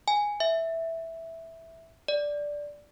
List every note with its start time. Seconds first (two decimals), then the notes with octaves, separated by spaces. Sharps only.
0.08 G#5
0.40 E5
2.08 D5